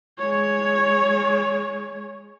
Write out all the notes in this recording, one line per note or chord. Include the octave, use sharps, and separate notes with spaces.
G#3 C#5